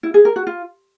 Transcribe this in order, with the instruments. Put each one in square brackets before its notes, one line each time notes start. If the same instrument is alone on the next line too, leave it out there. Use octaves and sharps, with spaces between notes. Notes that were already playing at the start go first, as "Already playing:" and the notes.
[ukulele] E4
G#4
A#4
F#4
F4